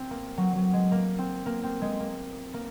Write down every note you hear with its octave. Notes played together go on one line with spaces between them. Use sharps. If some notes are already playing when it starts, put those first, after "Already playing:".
Already playing: C4
A#3
F#3
F#3
G#3
A#3
C4
A#3
C4
G#3
A#3
A#3